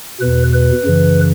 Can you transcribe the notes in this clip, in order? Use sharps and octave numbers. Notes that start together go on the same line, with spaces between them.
E2 B2 B4
B4
F#2 C#3 E3